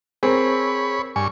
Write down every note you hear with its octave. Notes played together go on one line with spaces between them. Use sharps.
C4 G#4 A#4 C#5 B5
G2 G#5 C#6